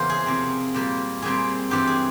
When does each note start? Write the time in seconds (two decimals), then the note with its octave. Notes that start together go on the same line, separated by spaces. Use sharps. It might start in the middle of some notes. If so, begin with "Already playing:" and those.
Already playing: E2 C#3 E3 A#3 C5
0.10 G#4
0.26 C3 F3 C4
0.74 A#2 G3 A#3
1.22 A#2 G3 C4 G#4
1.71 G2 E3 G3 C4 G4
1.87 G#4